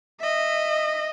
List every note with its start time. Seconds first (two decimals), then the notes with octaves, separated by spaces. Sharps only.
0.20 D#5 E5